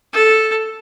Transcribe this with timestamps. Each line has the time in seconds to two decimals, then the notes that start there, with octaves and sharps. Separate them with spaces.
0.13 A4